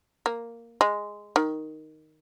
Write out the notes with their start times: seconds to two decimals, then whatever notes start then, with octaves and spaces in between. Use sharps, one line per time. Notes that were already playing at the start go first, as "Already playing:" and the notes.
0.26 A#3
0.81 G#3
1.36 D#3